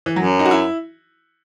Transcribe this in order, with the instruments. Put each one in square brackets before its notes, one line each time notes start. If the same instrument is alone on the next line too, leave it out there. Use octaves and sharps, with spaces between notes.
[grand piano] E3
[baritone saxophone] F#2 [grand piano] F#3
[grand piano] D#4
F#4
E4